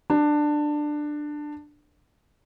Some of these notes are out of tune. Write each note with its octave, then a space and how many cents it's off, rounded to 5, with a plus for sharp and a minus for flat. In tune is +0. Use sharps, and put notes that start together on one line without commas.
D4 +15